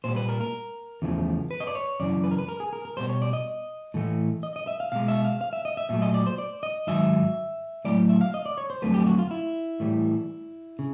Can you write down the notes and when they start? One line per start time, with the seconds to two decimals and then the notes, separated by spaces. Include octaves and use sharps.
0.04 A#2 G3 C5
0.16 B4
0.29 A#4
0.41 A#4
1.02 E2 C#3 F3 A3
1.51 B4
1.60 D#5
1.67 D5
1.75 C#5
2.00 F#2 C#3 E3 D5
2.24 B4
2.31 A#4
2.38 B4
2.49 A#4
2.60 G#4
2.73 A#4
2.85 A#4
2.97 B2 G3 C5
3.09 C#5
3.22 D5
3.33 D#5
3.94 A2 E3 A3
4.43 D#5
4.56 D#5
4.67 E5
4.80 F5
4.92 B2 G#3 F5
5.08 E5
5.24 F5
5.41 F5
5.53 E5
5.65 D#5
5.77 E5
5.89 A#2 F#3 A3 E5
6.02 D#5
6.14 D5
6.27 C5
6.38 D5
6.63 D#5
6.87 G#2 D#3 F#3 E5
7.85 A2 F#3 A3 D5
8.09 E5
8.21 F5
8.34 D#5
8.46 D5
8.58 C#5
8.70 C5
8.82 F2 D3 F#3 A3 B4
8.94 G4
9.06 F#4
9.18 F4
9.31 E4
9.80 A2 E3 G3
10.79 C#3